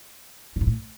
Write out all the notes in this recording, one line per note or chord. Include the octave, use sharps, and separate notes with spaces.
A#2
G#2
A2